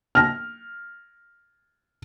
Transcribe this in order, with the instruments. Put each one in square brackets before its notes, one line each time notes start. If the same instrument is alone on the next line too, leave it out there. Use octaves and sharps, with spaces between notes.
[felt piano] F6 A#6